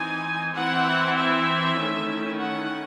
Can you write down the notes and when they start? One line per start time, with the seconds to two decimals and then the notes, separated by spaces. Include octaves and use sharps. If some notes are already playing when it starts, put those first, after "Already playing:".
Already playing: E3 C4 D#4 G#5
0.56 E3 C4 E4 F#5
1.17 E5
1.78 D#3 A3 C#4 E4
2.39 F#5